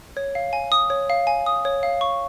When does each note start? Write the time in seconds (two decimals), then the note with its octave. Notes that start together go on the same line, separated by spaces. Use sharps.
0.17 C#5
0.35 F5
0.53 G#5
0.72 D#6
0.90 C#5
1.10 F5
1.27 G#5
1.46 D#6
1.65 C#5
1.83 F5
2.01 C#6